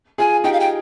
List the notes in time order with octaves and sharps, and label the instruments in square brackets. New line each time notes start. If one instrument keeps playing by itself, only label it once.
[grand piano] F4 G#4 [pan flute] G#5
[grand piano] D#4 G4 [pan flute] G5
[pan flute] F5
G5